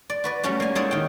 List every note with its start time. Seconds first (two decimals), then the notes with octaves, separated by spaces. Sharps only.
0.10 D5
0.24 F#4 B4 D5
0.43 G3 A3 C#4 F#4
0.60 A#3 G#5
0.75 G#3 D#4 E4 C#5 D5
0.91 D#3 G5